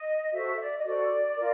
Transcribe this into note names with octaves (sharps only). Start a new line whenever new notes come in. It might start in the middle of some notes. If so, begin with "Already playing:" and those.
Already playing: D#5
F#4 A4 C5 E5
D5
D#5
F#4 A4 C5 D5
F4 A#4